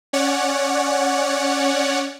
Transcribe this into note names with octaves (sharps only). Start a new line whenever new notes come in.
C#4 C#5 D5 F#5